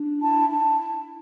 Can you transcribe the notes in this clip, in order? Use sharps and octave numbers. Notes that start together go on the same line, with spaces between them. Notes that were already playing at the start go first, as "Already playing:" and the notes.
Already playing: D4
E4 A5
E4 A5